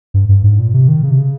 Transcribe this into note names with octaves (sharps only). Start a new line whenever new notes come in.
G2
G2
G#2
A#2
C3
D#3
C#3
C3
C#3